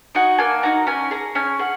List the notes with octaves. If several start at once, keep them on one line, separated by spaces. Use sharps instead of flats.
D#4 F#4 G#5
A#3 G#5
D#4 F#4 A#5
C#4 G#5
G#4 A#5
C#4 G#5
G#4 F#5